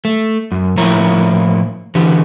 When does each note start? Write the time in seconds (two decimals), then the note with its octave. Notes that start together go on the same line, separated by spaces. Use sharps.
0.05 A3
0.52 F#2
0.78 A2 F3 A#3 E4 C#5 A#5
1.95 D3 E3 G4